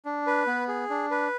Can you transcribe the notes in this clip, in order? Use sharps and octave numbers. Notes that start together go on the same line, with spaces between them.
D4
B4
B3
G#4
D4
B4